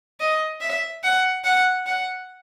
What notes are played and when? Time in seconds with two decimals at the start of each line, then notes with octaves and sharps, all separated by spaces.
0.20 D#5
0.61 E5
1.04 F#5
1.44 F#5
1.86 F#5